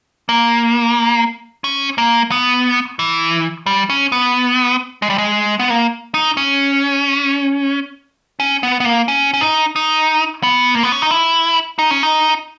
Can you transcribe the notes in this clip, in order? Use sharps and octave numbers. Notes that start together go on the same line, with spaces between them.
A#3
C#4
A#3
B3
E3
G3
C#4
B3
G#3
G3
G#3
B3
A#3
D#4
C#4
C#4
B3
B3
A#3
C#4
C#4
D#4
D#4
B3
A#3
B3
C#4
D#4
E4
D#4
C#4
D#4